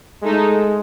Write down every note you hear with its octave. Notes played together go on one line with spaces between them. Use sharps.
G#3 A3 D#4 A4